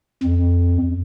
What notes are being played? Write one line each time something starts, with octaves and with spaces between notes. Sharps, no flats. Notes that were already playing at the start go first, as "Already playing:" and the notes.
F2